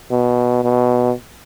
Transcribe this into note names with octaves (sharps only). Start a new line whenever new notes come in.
B2
B2